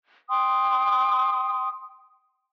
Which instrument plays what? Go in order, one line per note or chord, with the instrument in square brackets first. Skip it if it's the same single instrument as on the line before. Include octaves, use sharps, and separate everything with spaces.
[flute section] G5 C6 D#6